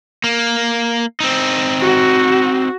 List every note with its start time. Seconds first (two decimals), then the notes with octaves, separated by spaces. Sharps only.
0.24 A#3
1.20 C4 D#4
1.81 F#4